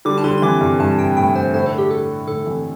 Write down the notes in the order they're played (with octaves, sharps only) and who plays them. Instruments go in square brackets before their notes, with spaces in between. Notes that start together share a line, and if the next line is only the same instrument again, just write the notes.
[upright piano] D3 G3 [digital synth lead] D6
[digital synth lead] A5
[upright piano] D3 G3 [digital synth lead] C6
[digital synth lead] C6
[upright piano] C3 E3 [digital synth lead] D6
[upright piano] G2 C3
[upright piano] G2 [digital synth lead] A5
[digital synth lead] G5
[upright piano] A2 [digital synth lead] G5
[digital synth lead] C5
[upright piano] A2 D3 [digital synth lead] C5
[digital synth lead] A4
G4
A4
[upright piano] A2 D3 [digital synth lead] A4
[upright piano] C3 E3